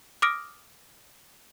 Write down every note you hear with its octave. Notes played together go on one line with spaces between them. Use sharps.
D6 D#6 F6 A#6 D7